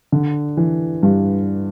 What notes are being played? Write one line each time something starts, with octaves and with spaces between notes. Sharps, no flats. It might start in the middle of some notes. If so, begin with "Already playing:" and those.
D3
E3
G2